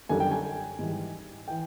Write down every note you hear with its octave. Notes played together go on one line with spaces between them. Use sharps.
F#2 D3 G3 G#5
G5
G#5
G#2 E3 G3
E3 G5